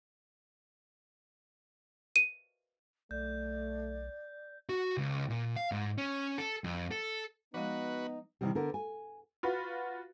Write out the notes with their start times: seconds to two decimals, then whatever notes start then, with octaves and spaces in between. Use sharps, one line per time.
2.16 D#7
3.11 B1 A3 D5 G6
4.69 F#4
4.97 C#2
5.30 A#2
5.56 F5
5.72 G#2
5.98 C#4
6.38 A4
6.64 F2
6.91 A4
7.54 F3 G#3 B3 D#4 F#4 B4
8.41 C3 D#3 E3 G3
8.55 D3 B3 A#4
8.74 G#5
9.43 F4 F#4 B4